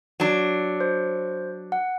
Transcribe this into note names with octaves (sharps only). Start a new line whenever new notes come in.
F#3 D4
C5
F#5